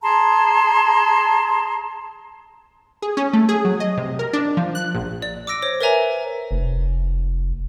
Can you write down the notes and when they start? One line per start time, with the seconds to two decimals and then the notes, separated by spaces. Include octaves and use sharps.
0.02 G#4 A5 A#5 C6
3.02 G#4
3.17 C#4
3.33 A3
3.49 G#4
3.65 F#3
3.80 D#5
3.97 C3
4.19 A#4
4.33 D4
4.57 F3
4.75 F#6
4.95 A#1
5.22 D5
5.47 D6 E6 A#6 D7
5.62 C5 C#5
5.81 A#4 B4 C#5 E5 G#5 A#5
6.51 F1